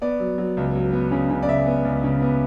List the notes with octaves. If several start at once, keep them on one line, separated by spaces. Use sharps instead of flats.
B3 D5
F#3
F#3
C#2
F#3
B3
C#3
C#3
D5
C#2 E5
B3
C#2
C#3
B3